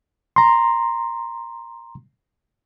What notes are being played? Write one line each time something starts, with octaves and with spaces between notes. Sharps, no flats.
A#5 C6